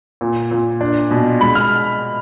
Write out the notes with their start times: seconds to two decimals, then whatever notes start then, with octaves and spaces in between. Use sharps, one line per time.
0.21 A#2
0.51 A#2
0.81 D4
1.11 B2
1.41 G#3 B5
1.55 F6